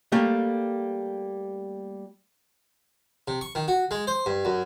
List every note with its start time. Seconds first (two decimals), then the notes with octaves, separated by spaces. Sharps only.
0.12 G3 A3 A#3 G4
3.28 C3
3.41 C#6
3.55 D#3
3.68 F#4
3.91 G#3
4.07 C5
4.26 G2
4.45 F#2